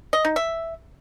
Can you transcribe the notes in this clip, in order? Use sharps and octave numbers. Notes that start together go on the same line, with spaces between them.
D#5
D#4
E5